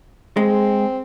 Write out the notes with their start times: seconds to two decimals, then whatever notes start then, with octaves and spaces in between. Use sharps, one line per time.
0.37 G#3 C4